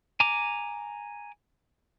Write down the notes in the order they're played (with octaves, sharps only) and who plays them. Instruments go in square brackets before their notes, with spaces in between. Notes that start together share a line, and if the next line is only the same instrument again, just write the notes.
[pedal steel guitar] G#5 A#5 D6